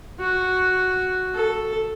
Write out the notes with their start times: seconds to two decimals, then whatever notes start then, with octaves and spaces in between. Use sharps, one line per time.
0.20 F#4
1.34 A4